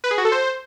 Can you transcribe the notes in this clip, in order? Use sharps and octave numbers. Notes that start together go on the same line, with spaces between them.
B4
G#4
F#4
A4
C5